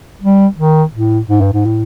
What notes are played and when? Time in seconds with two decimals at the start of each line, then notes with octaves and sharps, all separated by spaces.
0.22 G3
0.58 D#3
0.94 A2
1.30 G#2
1.41 G2
1.53 G#2
1.65 A2